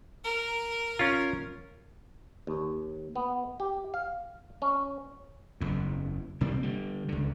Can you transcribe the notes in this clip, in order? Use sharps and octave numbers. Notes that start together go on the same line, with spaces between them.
A#4
C#4 F4
D#2
B3
G4
F5
C#4
F#1 E2
A#1 C3 G3 A#3
D3 G3
C#2 D3